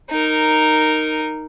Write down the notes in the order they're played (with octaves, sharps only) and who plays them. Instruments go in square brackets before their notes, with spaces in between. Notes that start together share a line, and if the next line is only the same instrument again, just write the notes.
[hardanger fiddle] D#4 A#4